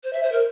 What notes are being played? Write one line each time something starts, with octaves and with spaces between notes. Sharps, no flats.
C5
E5
C5
A#4